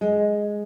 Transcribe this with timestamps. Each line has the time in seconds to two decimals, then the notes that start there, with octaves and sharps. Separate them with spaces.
0.01 G#3